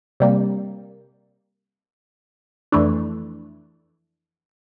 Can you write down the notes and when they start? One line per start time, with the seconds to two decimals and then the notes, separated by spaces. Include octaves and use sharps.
0.20 C3 G3 A#3
2.72 F2 E3 A3 D4